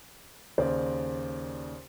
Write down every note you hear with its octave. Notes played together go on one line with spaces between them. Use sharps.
D#2 C#3 C5 D5